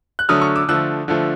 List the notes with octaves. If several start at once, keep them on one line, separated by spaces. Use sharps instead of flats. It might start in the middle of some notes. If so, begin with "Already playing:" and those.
F#6
D3 F#3 A3 D#6 F6
C#6 D#6
D6 E6
D3 F3 A3 E6 F#6
D3 F3 A3